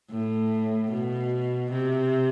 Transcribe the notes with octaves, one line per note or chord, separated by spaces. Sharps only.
A2
B2
C3